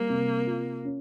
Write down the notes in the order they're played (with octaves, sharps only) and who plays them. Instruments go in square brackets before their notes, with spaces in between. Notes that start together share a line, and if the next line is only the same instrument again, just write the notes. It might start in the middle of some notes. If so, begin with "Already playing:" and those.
Already playing: [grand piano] G3 [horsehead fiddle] A#3
[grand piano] C3
F4
C#4